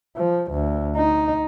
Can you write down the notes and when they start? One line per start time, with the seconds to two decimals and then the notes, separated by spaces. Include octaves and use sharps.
0.17 F3
0.52 D2
0.97 D#4